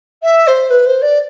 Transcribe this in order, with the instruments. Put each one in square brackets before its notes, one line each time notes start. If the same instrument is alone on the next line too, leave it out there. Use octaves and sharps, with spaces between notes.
[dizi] E5
C5
B4
C5
D5